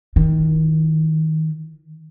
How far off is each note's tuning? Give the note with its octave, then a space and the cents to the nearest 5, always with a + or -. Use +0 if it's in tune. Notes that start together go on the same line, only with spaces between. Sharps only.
D#3 +25 F4 -45